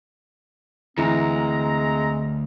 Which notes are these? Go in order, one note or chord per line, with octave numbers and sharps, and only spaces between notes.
D2 E3 G#3 C4 A#5